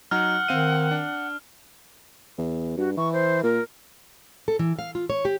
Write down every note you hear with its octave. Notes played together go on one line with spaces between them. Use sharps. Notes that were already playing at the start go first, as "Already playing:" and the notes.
F#3 D#4 F#5 A#5 F6
D#3 C4 F5 D#7
D4
E2
G2 F#4
E3 C#6
C5
A#2 A#4
A4
E3
F5
F4
C#5
G4